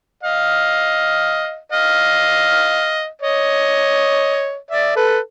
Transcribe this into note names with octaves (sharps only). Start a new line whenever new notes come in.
D#5 F5
D#5 F5
C#5 D#5
D5 E5
A4 B4